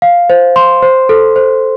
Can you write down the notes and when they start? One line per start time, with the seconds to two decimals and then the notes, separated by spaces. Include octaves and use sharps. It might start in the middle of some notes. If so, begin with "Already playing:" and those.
0.02 F5
0.30 C5
0.56 C6
0.82 C5
1.09 A4
1.36 C5